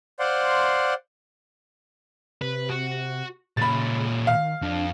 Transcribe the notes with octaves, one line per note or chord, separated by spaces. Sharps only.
C5 D5 F5 F#5 C6
C3 B4
F#4
A#2 C#3 C#4 B5 A6
D#3 F5
F2 D4